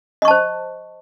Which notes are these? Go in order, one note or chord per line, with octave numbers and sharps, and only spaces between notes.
C5 D#5 A5 C#6